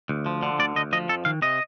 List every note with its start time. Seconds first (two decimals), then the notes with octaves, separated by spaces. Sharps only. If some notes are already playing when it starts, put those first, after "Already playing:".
0.09 D2
0.26 F3
0.43 D3
0.59 D2 D5
0.76 D2 D#5
0.93 F3 D#5
1.09 F2 A4
1.25 D#3 F5
1.42 C3 D#5